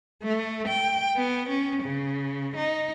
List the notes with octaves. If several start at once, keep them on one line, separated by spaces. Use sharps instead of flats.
A3
G5
B3
C#4
C#3
D#4